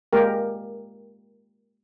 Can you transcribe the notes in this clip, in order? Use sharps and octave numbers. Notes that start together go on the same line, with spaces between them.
G#3 A#3 G4 A#4